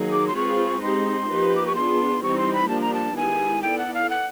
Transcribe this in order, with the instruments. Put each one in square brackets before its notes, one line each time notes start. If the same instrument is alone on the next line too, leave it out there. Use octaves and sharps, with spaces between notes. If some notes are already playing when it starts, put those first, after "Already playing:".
Already playing: [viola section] D#3 F#3 A#3 D#4 G#4
[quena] D6
C6
[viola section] G#3 C4 F4 G#4 B4 [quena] C#6
[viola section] G#3 C4 D#4 G4 [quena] C6
[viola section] F3 A#3 D#4 G4 B4
[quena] D6
C#6
[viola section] B3 D4 F4 G#4 [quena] C6
[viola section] E3 G3 C4 D#4 G4 [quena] C#6
[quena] C6
B5
[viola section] F3 A#3 D4 G4 [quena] A5
[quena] A#5
A5
[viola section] D#3 G#3 B3 E4 G4 [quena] G#5
[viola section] B3 E4 A4 D5 [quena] G5
[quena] F#5
F5
F#5